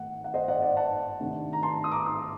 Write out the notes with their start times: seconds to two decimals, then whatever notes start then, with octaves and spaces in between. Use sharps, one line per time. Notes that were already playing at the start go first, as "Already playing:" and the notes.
Already playing: D#3 A3 F#5
0.24 F#5
0.34 C5 D#5
0.48 D5 F#5
0.62 D5 F#5
0.77 F#5 A5
1.20 C3 D#3 A3 D4
1.53 A#5
1.63 A5 C6
1.84 D#6
1.92 A#5 D6
2.06 C6 D#6